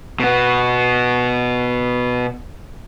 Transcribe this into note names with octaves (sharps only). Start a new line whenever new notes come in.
B2 B3